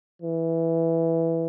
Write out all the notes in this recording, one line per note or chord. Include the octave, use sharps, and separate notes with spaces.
E3